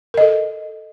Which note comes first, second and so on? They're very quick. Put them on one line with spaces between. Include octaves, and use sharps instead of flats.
A#4 D#5 A4